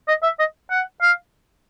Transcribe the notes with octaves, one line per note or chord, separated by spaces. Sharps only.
D#5
E5
D#5
F#5
F5